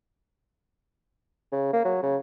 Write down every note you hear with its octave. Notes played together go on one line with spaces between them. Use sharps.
C#3
A#3
F#3
C#3